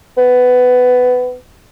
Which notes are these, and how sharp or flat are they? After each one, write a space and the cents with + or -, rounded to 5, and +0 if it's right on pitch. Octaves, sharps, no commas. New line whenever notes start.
B3 +15